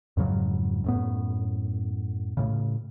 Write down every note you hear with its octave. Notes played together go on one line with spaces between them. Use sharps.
F2 G#2 C#3 F#3
F#2 A2 B3
A2 C#3